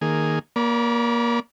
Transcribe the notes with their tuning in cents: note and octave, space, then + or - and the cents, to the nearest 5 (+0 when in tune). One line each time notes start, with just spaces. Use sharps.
D#3 +0 A#3 -5 G#4 +0
A#3 +20 D5 -25 B5 -35